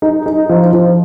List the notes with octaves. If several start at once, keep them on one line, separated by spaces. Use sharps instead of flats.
D#4
D#4
F3
F3